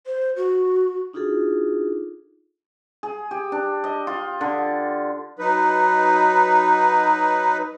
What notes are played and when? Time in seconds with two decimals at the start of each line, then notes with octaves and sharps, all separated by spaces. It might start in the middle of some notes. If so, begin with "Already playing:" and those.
0.06 C5
0.36 F#4
1.13 D4 D#4 F4 F#4 G#4 A4
3.03 G#4
3.31 G4
3.52 D4
3.84 D#5
4.07 F4
4.41 D3
5.39 F#3 D#4 B4